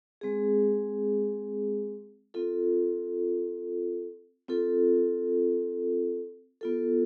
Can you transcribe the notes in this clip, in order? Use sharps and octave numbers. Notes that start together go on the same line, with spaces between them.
G#3 C4 G#4
C4 F4 A4
C4 F4 A4
B3 F4 A4